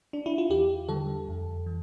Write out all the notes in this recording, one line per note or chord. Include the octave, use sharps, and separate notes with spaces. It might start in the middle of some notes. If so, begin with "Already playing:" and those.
D4
E4
F4
E2 G4
D3 G3 A4
F2
E3